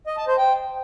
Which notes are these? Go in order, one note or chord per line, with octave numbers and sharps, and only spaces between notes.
D#5
A5
C5
G5